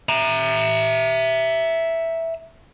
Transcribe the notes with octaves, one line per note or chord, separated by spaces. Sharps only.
E5 A#5